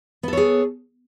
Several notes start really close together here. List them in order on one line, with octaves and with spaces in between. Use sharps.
B3 A4 C#5 G#4